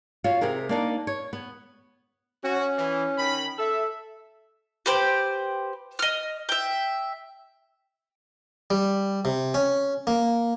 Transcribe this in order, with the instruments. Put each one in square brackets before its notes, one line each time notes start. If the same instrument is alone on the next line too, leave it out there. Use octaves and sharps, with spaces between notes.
[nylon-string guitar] F4 F#4 C#5 F5
C3 G4 G#4 A#4
A#3 D4 D#4
C#5
B3
[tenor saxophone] C#4 [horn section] F#4
[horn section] E3
D#3 B5
[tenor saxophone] A4 [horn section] E5
[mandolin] G4 B4 C5 G5
D#5 F6
E5 G5
[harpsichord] G3
C3
C#4
A#3